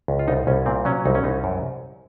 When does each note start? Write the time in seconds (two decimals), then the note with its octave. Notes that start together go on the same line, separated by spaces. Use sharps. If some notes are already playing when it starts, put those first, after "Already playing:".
0.08 C#2
0.19 F4
0.28 C2 D#4
0.47 C2 C#4
0.66 A#2 C4
0.85 F#3 C#4
1.05 C2 D#4
1.15 C#4
1.24 C2 D#4
1.44 F#2